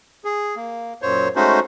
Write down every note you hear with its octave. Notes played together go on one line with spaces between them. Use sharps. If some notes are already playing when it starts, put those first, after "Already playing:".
G#4
A#3
F#2 A#2 C5 C#5
G#3 A3 C#4 D#4 F#4 C5